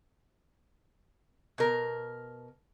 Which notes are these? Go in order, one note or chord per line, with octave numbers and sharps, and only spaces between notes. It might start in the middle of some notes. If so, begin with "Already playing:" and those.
B2 A#4